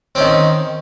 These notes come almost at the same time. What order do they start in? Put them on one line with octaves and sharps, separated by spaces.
C4 C#4 D#3